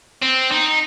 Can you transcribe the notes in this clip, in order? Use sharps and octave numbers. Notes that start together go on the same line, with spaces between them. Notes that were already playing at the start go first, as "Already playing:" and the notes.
C4
D#4